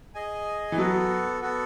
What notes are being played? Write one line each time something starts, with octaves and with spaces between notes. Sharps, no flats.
G#4 D#5 G#5
E3
F#3 B3 F#4 A4
B3 F#4 A4